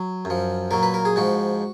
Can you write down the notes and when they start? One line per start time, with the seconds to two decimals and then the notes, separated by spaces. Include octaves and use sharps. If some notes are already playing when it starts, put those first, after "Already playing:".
Already playing: F#3
0.25 F#2
0.30 F3
0.71 A#2 F#3 A#4
0.83 B4
0.94 A#4
1.05 G#4
1.16 G#2 F3 F#4